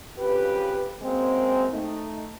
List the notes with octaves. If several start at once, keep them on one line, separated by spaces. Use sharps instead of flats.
F2 C#3 G4 B4
F#2 G#3 A#3 C4
A3 D#4